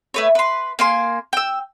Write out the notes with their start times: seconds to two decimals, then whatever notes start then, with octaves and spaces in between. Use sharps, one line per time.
0.14 A3 B4 C#5
0.35 B4 C6
0.79 A#3 G#5 C6
1.33 G5 E6